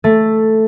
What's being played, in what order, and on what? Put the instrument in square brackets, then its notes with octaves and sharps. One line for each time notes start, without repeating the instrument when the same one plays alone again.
[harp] A3